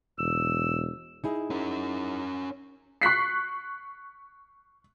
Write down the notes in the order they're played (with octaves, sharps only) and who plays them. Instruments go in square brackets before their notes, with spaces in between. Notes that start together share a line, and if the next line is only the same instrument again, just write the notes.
[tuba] E1 [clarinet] E6
[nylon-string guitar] D#4 E4 G#4
[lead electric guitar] C#4 A#4
[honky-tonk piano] C#6 F#6 B6 C7